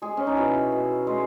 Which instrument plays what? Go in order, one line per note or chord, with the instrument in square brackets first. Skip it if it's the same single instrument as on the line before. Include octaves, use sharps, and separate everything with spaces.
[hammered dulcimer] G#3 G#4
C#4
D#4
B2 E4
B2
G#3